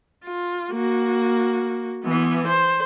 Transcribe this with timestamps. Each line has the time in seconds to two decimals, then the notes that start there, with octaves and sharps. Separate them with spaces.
0.24 F4
0.72 A#3 F#4
2.05 E3 B3
2.47 C5